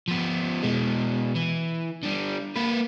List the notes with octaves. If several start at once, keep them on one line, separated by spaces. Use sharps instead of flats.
F3 B3
B2 G#3
E3
D3 G3
A#3 B4